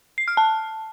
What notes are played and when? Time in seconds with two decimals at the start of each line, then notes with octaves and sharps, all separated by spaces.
0.18 C7
0.28 F6
0.37 A5